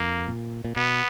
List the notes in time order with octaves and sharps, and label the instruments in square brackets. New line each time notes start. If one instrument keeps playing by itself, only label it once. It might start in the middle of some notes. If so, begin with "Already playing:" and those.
Already playing: [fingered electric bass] F2 [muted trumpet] A#3
[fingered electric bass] A#2
A#2
[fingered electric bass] B2 [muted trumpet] B3